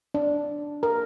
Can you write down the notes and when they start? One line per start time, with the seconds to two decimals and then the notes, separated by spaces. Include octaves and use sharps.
0.14 D4
0.83 A#4